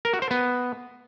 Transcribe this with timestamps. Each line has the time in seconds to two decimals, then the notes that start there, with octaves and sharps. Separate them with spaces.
0.05 A#4
0.13 F#4
0.22 C5
0.31 B3